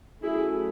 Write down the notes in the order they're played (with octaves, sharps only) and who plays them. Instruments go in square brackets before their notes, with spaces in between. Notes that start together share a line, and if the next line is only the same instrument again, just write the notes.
[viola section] F#3 A3 C#4 E4 G#4